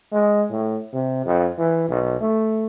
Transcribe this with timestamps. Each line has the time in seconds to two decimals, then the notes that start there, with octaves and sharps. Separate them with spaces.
0.12 G#3
0.50 A2
0.93 C3
1.25 F2
1.58 E3
1.89 B1
2.20 A3